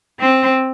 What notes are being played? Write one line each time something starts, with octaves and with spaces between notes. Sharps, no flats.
C4